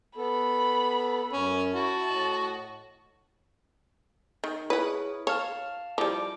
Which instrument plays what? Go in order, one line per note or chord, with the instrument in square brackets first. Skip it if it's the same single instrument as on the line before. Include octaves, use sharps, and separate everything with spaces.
[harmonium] B3 A4 [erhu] B5
[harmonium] F#2 [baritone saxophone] C#4
[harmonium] E4 [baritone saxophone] F#4 [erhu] A5
[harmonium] A2 D#5
[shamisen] D#3
[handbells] E4 G#4 C#5 [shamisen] B4 F#5
[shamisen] C#5 [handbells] F5 A5 F6
[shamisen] F3 G3 [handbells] E4 D6